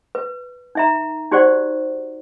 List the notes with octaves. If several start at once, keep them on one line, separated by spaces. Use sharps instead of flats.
B4
D#4 E5 A#5
D#4 F#4 G4 C5 D5 F#5